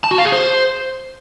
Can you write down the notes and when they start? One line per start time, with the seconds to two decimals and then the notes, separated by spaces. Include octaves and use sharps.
0.04 A5
0.11 F#4
0.18 F5
0.25 G#4
0.32 C5